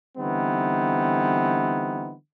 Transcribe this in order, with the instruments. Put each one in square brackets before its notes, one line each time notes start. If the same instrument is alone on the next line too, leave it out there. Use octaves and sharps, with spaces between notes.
[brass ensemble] D3 E3 G3 B3 C4 D#4